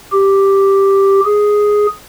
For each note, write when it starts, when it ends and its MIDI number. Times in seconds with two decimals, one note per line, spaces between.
0.13 1.21 67
1.25 1.87 68